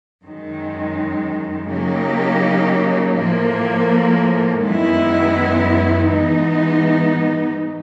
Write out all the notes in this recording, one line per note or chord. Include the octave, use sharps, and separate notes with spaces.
F#2 D#3 G#3
C#3 F#3 A#3 D#4 G4
A2 F3 A#3
F#2 D#3 G#3 B3 E4
G#2 E3 G#3 B3 D#4